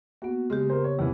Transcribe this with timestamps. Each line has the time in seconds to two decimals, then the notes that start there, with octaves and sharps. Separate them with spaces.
0.22 A#3 B3 F#4
0.50 C#3 G#3 G4
0.70 A#4 C5
0.84 C#5
0.99 E2 C3 E3